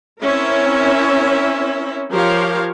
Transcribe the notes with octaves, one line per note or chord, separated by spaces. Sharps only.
C4 C#4 E4 A#4 C#5 E5
F3 G4 A#4 C5 C#5 F5